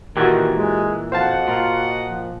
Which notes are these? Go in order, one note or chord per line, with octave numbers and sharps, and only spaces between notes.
A#2 D#3 E3 F#4 G4
G#3
F2 F#4 C5 D#5 F5 F#5 A5
A#2 F4
F3